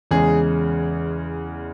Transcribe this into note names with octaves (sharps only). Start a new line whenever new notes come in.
E2 C#3 G#3 G#4